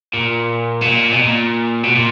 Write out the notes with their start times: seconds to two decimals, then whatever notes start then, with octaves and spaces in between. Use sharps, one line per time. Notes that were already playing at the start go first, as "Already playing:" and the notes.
0.14 A#2
0.82 B2
0.86 A#2
1.13 B2
1.23 A#2
1.83 B2
1.95 A#2